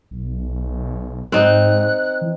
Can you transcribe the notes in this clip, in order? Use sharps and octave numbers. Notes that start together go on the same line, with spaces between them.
B1
G#2 C4 D#4 F#6
E3